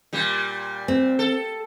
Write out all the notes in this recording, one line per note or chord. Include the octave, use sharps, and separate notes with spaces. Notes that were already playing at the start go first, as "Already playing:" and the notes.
A#2 G3
C4
A4